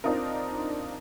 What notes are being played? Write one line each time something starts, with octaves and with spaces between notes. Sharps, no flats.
C4 D4 D#4 F4 A#4